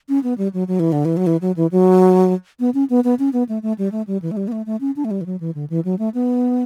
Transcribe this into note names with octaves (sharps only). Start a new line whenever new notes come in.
C#4
B3
G3
F#3
F#3
E3
D3
E3
F#3
E3
F#3
E3
F#3
B3
C#4
B3
B3
C#4
B3
A3
A3
G3
A3
G3
E3
A3
G3
B3
A3
A3
C#4
D4
A3
G3
E3
F#3
E3
D3
E3
F#3
A3
B3